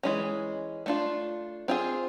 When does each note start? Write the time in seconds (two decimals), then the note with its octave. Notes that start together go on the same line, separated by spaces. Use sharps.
0.03 E3 G#3 C#4
0.86 A3 D4 F4
1.68 C4 F4 G#4